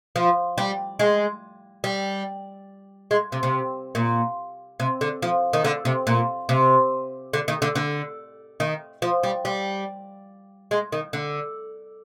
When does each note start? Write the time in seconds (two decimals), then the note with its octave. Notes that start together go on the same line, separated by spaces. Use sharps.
0.16 F3
0.58 G3
0.99 G#3
1.84 G3
3.11 G#3
3.32 C3
3.43 C3
3.95 A#2
4.80 C3
5.01 D3
5.22 F3
5.53 D#3
5.64 D3
5.85 C3
6.07 A#2
6.49 C3
7.33 D3
7.48 D#3
7.62 D3
7.75 D3
8.60 D#3
9.02 F3
9.23 G3
9.45 G3
10.71 G#3
10.92 D#3
11.13 D3